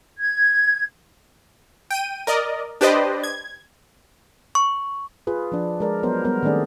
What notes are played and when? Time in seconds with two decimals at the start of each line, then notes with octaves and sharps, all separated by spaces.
0.20 G#6
1.91 G5 D#7
2.27 A#4 D5 D#5
2.81 D4 G4 B4 C5 D5 D#5
3.24 G#6
4.55 C#6
5.27 F4 G#4 B4
5.52 F3 D4
5.80 G#3 A#4 D5
6.03 F#3 B3 A#4 C5
6.25 G3 B3 A#4
6.43 D#3 A3 C4 D4 G#4 D5